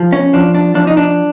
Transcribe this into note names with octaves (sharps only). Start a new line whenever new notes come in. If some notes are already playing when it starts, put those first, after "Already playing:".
Already playing: F3
C#4
F3 D4
D4
F3 D4
D#4
D4